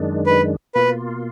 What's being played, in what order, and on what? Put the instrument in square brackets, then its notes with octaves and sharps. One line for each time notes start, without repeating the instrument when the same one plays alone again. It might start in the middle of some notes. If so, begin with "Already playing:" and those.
Already playing: [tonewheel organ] F#2 D#3 G#3 D4
[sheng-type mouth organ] B4
[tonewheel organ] B2 A#3 F4 [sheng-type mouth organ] B4